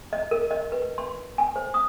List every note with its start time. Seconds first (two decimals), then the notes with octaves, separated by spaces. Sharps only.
0.13 D#5
0.31 A#4
0.51 D#5
0.72 B4
0.98 C6
1.38 G#5
1.56 C5
1.74 D#6